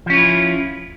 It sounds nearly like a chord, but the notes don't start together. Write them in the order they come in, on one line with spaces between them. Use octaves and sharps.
F3 C#4 F4 E4